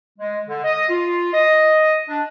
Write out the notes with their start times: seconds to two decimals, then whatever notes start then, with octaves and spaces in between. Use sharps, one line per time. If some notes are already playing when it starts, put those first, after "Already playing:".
0.19 G#3
0.48 D3
0.64 D#5
0.89 F4
1.33 D#5
2.09 D4